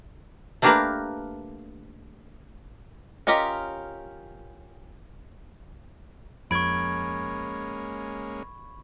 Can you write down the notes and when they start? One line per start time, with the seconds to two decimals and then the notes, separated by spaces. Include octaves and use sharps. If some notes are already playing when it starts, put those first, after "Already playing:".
0.62 A3 A#3 D4 G4 A#4 B4
3.27 C#4 F4 G4 A#4 D#5
6.51 F2 G#3 A#3 C#4 B5 C#6 G#6 D7